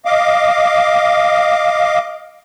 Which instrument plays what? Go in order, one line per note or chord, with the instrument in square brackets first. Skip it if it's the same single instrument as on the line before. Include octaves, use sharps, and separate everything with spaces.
[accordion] D#5 F5 D6